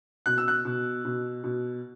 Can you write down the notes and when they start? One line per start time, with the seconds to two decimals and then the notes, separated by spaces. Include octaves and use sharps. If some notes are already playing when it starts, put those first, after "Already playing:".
0.26 B2 F#6
0.38 E6
0.48 F#6
0.65 B2
1.05 B2
1.44 B2